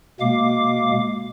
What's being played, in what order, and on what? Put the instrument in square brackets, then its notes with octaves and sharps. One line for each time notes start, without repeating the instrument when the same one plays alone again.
[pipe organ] B2 G#3 A#3 F5 D6